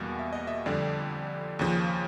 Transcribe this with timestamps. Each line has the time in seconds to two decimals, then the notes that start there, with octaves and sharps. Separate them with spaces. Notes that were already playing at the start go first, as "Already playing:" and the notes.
Already playing: E2 B2 G3 A#3 F5
0.19 E5
0.33 D#5
0.47 E5
0.66 F2 D3 G3 D5
1.59 D#2 C#3 F3